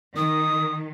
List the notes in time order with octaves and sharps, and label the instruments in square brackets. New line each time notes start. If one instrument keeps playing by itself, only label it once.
[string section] D#3 [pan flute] D#6